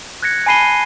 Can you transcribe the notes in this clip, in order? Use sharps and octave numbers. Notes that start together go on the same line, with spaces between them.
F#6 G#6 A#6 C#7
G#5 A5 B5 C7 D#7 G7